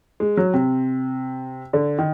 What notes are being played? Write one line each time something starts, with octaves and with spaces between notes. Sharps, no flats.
G#3
F#3
C3
D3
D#3